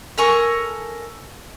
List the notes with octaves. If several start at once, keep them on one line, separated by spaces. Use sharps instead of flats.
A4 A#4 G#5 C#6